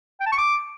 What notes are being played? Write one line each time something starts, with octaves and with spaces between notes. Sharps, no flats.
G5
A5
C#6
D6